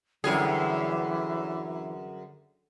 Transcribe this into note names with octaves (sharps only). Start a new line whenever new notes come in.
F#2 D3 E3 G3 G#4